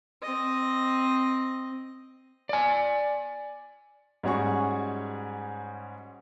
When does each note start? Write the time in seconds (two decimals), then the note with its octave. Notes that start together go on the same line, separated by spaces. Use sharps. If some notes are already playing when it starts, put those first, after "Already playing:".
0.22 C4 D#5
2.49 D5 G#5
4.23 G#2 G3 C#4 F#4 G#4 C#6